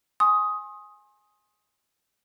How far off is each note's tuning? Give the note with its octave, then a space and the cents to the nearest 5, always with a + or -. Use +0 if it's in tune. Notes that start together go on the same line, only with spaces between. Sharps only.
G#5 +0 C6 +35 D#6 +10